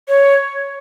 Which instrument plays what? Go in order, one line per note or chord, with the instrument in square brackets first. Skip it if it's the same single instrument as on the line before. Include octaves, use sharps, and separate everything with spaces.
[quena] C#5